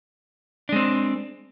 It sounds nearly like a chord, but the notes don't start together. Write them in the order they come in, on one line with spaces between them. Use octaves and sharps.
D4 G#3 C4